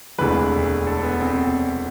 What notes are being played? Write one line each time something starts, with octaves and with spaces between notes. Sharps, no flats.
E1 D2 C3 E3 G#3 B4
A4
B3
C4
C4